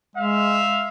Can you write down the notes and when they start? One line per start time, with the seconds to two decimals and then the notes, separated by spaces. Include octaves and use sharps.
0.16 G#3 E5 F5